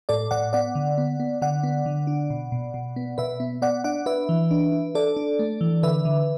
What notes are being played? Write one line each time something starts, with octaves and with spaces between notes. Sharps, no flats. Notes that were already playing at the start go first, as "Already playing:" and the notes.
A2 A4 D5
A2 D5 F#5
B3 D5 F#5
D3
B3
B3
D3 D5 F#5
B3
D3
D4
B2
B2
B2
B3
B2 B4 E5
B3
B3 D5 F#5
D4 D5 F#5
D4 B4 E5
E3
D4
D4
D4 A4 D5
D4
A3
E3
D3 B4 E5
D3